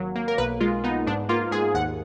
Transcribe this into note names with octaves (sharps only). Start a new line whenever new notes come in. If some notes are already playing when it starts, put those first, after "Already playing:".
Already playing: G#1 F#3 A#3
A#3
A#4
B1 B4
G#3 F4
B3 D#4
G#2 D4
A#3 F4
G#2 G#4
D#2 F#5